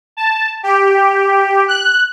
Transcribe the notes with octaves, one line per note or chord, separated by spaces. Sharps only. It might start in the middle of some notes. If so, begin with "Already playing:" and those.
A5
G4
F#6